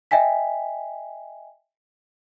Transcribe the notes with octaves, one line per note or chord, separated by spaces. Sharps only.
D#5 E5 G5 G#5 B6